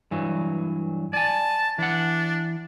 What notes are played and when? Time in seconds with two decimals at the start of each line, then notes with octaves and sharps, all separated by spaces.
0.11 G2 E3 F#3
1.13 D5 G#5 A5
1.78 E3 D4 F#5